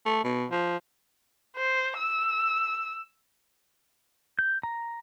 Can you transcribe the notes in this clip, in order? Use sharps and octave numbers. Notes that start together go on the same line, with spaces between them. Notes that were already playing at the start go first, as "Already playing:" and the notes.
A3
B2
F3
C5
E6
G6
A#5